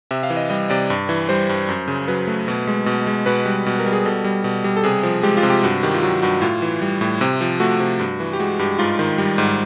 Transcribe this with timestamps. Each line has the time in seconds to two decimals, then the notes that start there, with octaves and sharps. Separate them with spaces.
0.11 C3 E5
0.23 F5
0.30 E3
0.37 D#5
0.50 G3 D#5
0.70 C3 D5
0.90 G2
1.09 E3
1.29 G3 C5
1.49 G2
1.69 F#2
1.88 C#3
2.08 F#3 B4
2.28 A3
2.48 B2
2.67 G#3
2.86 B2
3.07 G#3
3.26 B2 B4
3.46 G3
3.66 B2
3.79 A#4
3.86 G3
3.92 G#4
4.05 B2 A4
4.24 G3
4.44 B2
4.64 G3
4.77 A4
4.84 C3 G#4
5.03 F3
5.23 G#3 G4
5.37 F4
5.43 C3
5.50 G4
5.63 G2 F#4
5.83 D#3 G4
5.94 F4
6.03 F#3 F#4
6.22 G2 F#4
6.42 A2 F4
6.62 E3
6.82 G3
7.01 A2
7.21 C3
7.41 F3
7.60 A3 F#4
7.80 C3
7.99 G2
8.20 E3
8.33 G4
8.39 G#3 F#4
8.59 G2 G4
8.79 G#2 F4
8.99 D#3
9.18 G3
9.38 G#2